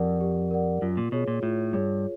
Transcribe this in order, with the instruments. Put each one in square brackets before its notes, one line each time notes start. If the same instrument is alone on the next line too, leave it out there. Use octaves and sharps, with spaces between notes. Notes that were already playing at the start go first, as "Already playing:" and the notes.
Already playing: [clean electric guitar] F2 [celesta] G4 A#4 D5 F#5
[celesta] G4
A#4 D5 F#5
[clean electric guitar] F#2 [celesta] F4
[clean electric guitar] A#2
[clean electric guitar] B2 [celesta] G#4 C#5
[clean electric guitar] A#2
[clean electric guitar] A2 [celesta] F4
[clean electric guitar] G2 [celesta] G#4 C#5